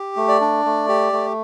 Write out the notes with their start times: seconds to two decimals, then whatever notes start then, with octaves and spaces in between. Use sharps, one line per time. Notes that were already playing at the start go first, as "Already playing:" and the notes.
Already playing: G4
0.16 A3
0.28 D5
0.41 D4
0.65 A3
0.89 G4
1.13 A3